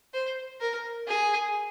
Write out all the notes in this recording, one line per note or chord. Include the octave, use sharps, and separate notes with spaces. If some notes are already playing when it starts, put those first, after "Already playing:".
C5
A#4
G#4